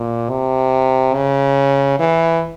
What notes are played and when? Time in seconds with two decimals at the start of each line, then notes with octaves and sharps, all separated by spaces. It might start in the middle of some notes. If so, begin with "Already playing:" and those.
Already playing: A#2
0.29 C3
1.15 C#3
1.99 E3